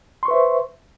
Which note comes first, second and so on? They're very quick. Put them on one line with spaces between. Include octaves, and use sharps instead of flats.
C6 C#6 B4 E5 C5